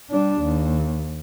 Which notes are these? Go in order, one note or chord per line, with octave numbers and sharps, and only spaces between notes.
G3 D4
D#2